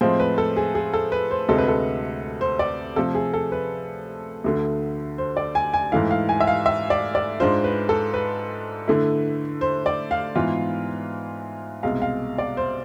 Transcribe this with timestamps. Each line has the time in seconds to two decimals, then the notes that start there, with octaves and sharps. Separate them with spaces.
0.01 A2 F3 G#3 C4 C5
0.20 B4
0.38 A4
0.56 G#4
0.75 G#4
0.94 A4
1.12 B4
1.31 C5
1.49 D2 C3 G#3 A4
1.58 B4
1.68 A4
2.41 C5
2.59 D5
2.96 C3 F3 A3 A4
3.15 G#4
3.34 A4
3.52 B4
4.44 D2 D3 A3
5.18 C5
5.37 D5
5.55 G#5
5.73 G#5
5.92 G#2 E3 A3 E4 F5
6.11 F5
6.29 G#5
6.40 E5
6.47 F5
6.66 E5
6.90 D5
7.15 D5
7.40 G#2 G#3 D4 F4 C5
7.64 B4
7.89 A4
8.14 B4
8.88 D3 A3 E4
9.61 C5
9.86 D5
10.11 F5
10.35 G#2 E3 B3 F4
11.83 C2 B2 G#3 F5
12.02 F5
12.38 D5
12.57 C5